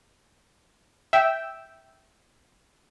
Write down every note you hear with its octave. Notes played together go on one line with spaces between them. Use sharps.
E5 G5 E6